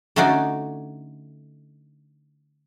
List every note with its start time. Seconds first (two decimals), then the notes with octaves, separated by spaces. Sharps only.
0.16 D3 A3 C#4 D#4 F#4 D5